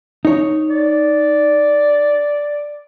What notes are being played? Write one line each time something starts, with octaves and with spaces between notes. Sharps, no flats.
D#4 C#5
D5